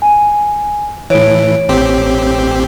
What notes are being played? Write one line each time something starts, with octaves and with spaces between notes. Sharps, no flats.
G#5
A2 E3 C#5 D7
A1 C4 G4